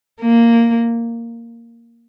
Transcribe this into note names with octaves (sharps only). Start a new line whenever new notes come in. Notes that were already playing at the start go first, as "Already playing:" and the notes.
A#3